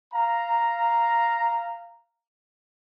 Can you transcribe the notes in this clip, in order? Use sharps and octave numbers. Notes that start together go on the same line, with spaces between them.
F5 A#5